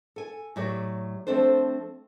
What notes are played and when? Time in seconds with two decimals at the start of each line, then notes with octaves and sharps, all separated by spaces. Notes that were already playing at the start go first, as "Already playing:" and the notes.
0.16 A4 G#5
0.56 A2 F#3 G4 D5
1.27 F3 A3 C4 D4 A4 C5